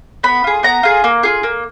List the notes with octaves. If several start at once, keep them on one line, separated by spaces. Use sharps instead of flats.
B3 B5
F4 G#4
B3 A#5
F4 G#4
A#3
F4 G#4
A#3